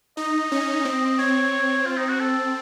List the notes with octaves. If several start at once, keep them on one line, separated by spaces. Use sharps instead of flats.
D#4 D#5
C#4
C4
C4 C#5
F4
D#4
F#4
A4